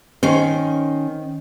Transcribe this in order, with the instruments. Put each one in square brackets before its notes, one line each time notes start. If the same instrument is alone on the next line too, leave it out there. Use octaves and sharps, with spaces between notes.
[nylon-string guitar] D#3 C#4 C5